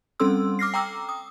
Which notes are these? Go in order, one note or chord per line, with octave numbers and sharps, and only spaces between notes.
G3 C4 C#4 A4 C6 E6
D6 F6 A#6 C7
G5 A#5 D6 E6
D#6